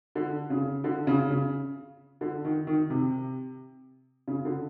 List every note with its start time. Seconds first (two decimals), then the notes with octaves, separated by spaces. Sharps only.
0.15 D3
0.50 C#3
0.84 D3
1.07 C#3
1.30 C#3
2.21 D3
2.45 D#3
2.67 D#3
2.90 C3
4.28 C#3
4.45 D3